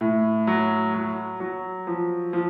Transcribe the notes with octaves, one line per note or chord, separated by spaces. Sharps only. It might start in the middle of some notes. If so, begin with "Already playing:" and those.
A2
F#3
F#3
F#3
F3
F3